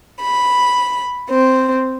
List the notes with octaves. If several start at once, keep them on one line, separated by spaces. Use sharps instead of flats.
B5
C4